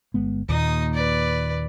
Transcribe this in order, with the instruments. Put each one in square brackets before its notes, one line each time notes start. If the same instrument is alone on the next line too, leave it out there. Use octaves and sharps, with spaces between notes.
[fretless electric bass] G1 G#3 B3
[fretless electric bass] D#2 A#2 [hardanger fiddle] D#4 D#6
[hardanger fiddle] B4 D5